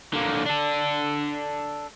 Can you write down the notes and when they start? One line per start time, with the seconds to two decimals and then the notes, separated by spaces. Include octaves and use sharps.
0.13 D3 A#3
0.46 D4 A4